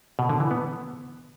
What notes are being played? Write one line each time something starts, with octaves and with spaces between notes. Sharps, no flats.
B2
D3
E3
B3